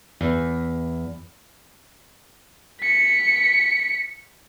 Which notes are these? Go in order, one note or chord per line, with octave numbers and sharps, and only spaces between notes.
E2
B6 C#7